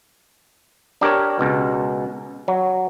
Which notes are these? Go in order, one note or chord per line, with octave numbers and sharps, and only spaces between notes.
D4 G4 A#4 C#5
C#2 B2
F#3